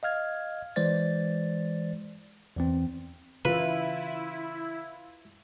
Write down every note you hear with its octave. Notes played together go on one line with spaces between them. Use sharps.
D#5 F5 F6 G#6
E3 G#3 C5 D5 A6
E2 E3 C4
C#3 E3 E4 F4 B4